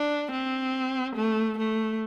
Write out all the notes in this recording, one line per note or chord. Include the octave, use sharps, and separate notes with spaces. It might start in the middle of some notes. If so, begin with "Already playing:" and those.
Already playing: D4
C4
A3
A3